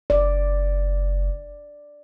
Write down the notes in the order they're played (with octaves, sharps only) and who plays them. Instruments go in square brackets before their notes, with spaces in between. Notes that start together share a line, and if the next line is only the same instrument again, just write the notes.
[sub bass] F#1 [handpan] D5